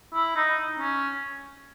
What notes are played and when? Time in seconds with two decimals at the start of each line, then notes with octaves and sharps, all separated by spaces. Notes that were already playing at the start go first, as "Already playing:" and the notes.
0.14 E4
0.36 D#4
0.79 C#4